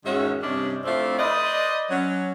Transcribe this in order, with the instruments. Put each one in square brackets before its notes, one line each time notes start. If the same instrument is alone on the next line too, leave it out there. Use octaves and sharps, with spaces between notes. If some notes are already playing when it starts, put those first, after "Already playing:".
[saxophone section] E2 G#2 D#3 C#4 F#4 E5
G2 C3 C#4 D4 E4 D#5
F2 A3 C4 D4 E4 F5
B4 C5 D5 D#5
F#3 C#4